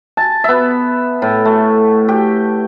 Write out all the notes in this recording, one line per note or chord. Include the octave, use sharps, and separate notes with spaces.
A5
B3 E5
A2
A3
G4